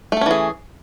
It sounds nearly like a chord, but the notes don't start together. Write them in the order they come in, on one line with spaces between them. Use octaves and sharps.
A3 A4 C#4 E3 G#4